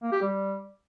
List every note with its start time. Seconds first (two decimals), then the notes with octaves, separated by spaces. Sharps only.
0.03 A#3
0.12 G4
0.22 G3